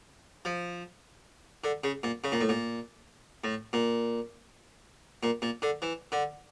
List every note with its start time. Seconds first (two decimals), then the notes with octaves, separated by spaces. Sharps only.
0.45 F3
1.64 D3
1.84 C#3
2.03 A#2
2.24 C#3
2.32 A#2
2.41 A2
2.49 A#2
3.44 A2
3.73 A#2
5.23 A#2
5.42 A#2
5.62 D3
5.82 E3
6.12 D3